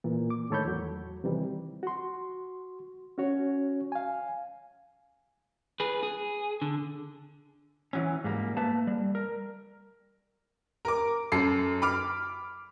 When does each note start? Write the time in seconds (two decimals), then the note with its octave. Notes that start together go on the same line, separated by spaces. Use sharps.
0.04 A#2 E3
0.30 D6
0.50 A2 D#3 A4 C#5 B5 G6
0.65 E2 F#3
1.24 C3 D#3 E3 G3
1.83 F#4 C6
3.18 C#4 F#4 C#5
3.92 F5 G#5
5.80 G#4 B4
6.03 G#4
6.62 D3
7.93 E3 F#3 C#4
8.24 G#2 G3 A#3
8.57 A3 A#3 B4 A5
8.87 G3
9.15 A#4
10.85 A#4 D6
11.32 F#2 A4 C7
11.82 B5 D6 F6